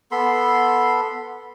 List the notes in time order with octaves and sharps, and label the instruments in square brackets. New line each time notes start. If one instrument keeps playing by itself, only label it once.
[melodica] B3 A4 B5 C6